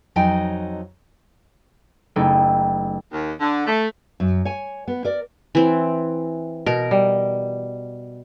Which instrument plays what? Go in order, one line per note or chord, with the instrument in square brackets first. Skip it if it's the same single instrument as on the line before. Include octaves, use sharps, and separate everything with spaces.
[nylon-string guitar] F2 F#3 D#4 D#5 G5 G#5
[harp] F#1 A3 D#4 E4 G5
[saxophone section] D#2
D3
A3
[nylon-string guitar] F#2
C#5 G#5
B3
A#4 D5
[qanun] E3 C4
[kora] B2 [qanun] A#4
[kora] G3